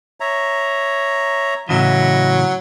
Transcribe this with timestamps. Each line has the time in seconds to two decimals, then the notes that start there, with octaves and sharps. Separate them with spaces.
0.20 C#5 E5 A#5
1.69 A2 C#3 E3 F#3 D#5 E5